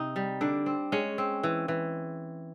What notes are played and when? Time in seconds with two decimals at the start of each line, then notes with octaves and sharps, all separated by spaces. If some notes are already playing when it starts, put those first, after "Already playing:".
Already playing: C3 C4 D#4
0.16 G3
0.41 D3 D4
0.66 C4
0.92 G#3 C#4
1.18 C4
1.43 E3
1.68 E3